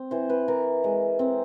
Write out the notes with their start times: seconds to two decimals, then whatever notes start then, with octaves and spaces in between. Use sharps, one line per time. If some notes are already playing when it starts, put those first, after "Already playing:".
Already playing: C4
0.11 E3 C5
0.29 B4
0.48 E3 A#4
0.84 G#3
1.19 C4